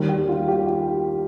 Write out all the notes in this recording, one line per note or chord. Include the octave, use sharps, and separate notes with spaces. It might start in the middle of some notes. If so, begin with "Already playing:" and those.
Already playing: D#2 D#3 G3
G4
F4
G4
G4